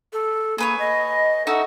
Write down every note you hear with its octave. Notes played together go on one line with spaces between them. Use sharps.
A4
A#3 G#4 B4 C#5
D#5
D#4 F#4 A4 E5